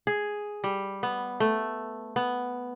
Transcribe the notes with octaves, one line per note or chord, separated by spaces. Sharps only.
G#4
G3
B3
A3
B3